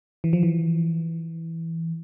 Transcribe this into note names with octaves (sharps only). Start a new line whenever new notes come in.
E3
F3
E3